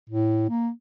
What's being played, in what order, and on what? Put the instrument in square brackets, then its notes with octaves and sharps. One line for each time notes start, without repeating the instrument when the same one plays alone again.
[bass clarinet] A2
A#3